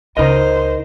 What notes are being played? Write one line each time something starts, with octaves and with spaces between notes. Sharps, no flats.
C#2 C#3 D#4 A#4 C5 D#5